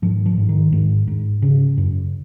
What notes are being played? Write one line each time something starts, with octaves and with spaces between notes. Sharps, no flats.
G#2 F3
F3
G#2
D#3
G#2
G#2
C#3
F#2